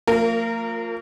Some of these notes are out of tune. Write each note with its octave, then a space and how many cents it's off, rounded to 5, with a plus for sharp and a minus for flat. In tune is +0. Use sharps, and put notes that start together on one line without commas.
F3 +20 A#3 -40 A#4 -10